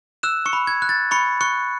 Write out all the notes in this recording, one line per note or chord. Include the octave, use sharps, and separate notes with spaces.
E6 F#6 E7
C#6 C#7
B5
G#6
F#6
A6
B5 C#6 C#7
C#6 F#6 C#7